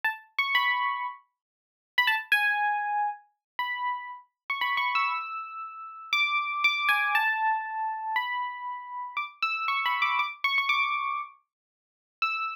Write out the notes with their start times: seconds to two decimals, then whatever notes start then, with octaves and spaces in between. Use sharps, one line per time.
0.04 A5
0.39 C#6
0.55 B5
1.98 B5
2.07 A5
2.32 G#5
3.59 B5
4.50 C#6
4.61 B5
4.77 C#6
4.95 E6
6.13 D6
6.64 D6
6.89 G#5
7.15 A5
8.16 B5
9.17 D6
9.42 E6
9.68 C#6
9.86 B5
10.02 D6
10.19 D6
10.44 C#6
10.58 C#6
10.69 D6
12.22 E6